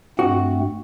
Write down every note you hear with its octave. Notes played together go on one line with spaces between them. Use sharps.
G2 A3 C4 F#4